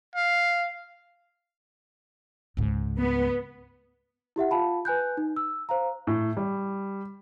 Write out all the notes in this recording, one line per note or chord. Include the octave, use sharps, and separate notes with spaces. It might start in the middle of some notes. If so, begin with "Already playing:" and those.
F5
C#2 G#2
B3
E4 G4 E5 F#5
F4 F5 A5 B5
B4 G#5 F#6 G6
D#4
E6
C5 F5 A#5
A2
G3